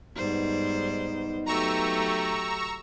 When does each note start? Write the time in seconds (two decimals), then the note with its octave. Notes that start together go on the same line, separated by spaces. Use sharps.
0.16 G#2 G3 B3 D#4 C5
1.46 F#3 A3 F#4 G4 A#5 C#6 E6